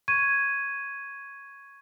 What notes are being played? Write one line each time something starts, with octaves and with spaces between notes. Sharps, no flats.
C#6 G#6 D#7